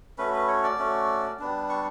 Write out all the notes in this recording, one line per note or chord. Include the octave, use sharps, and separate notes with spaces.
A3 C#4 F#4 B4
B4
C#5
D5
A3 C#4 F#4
G3 B3 D4
C#6